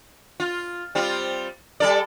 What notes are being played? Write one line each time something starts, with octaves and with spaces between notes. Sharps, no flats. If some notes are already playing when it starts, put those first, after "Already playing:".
F4
G3 C4 F4
G3 A4 D5